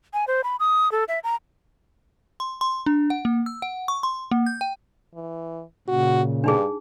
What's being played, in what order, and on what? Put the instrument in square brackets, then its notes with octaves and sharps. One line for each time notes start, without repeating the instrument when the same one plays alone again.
[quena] G#5
C5
B5
D#6
A4
E5
A#5
[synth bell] C6
C6
D4
F#5
A#3
E6
F#5
C#6
C6
A#3
G6
G5
[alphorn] E3
[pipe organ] A#2 C#3 [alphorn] F#4
[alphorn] G2 [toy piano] D4 D#4 G#4